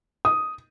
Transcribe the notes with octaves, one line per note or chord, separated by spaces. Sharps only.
D#6